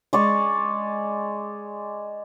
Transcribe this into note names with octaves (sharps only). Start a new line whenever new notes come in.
G#3 D5 C#6